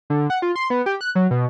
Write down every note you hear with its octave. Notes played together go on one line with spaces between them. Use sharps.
D3
F#5
F4
C6
B3
G4
F#6
F#3
B2